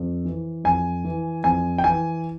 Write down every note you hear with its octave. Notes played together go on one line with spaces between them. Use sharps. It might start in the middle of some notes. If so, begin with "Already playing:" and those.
Already playing: F2
E3
F2 G#5
E3
F2 G#5
G5
E3 G#5